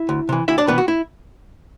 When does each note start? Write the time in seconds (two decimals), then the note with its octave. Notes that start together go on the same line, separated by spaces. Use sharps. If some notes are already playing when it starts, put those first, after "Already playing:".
Already playing: E4 E5
0.09 D2
0.29 C3 E3
0.48 D2 E4 E5
0.58 D4 D5
0.67 C3 E3 B3 B4
0.78 F#4
0.88 E4